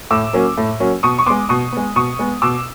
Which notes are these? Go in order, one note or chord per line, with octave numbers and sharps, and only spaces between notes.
A2 D6 E6
F#3 A#3 C#4
A2
F#3 A#3 C#4
B2 C#6 D#6
C#6
G#3 B3 C6 D6
B2 C#6 D#6
G#3 B3
B2 C#6 D#6
G#3 B3
B2 D6 E6